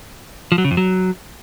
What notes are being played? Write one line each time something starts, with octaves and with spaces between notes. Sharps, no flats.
F3
F#3
C#3
F2
F#3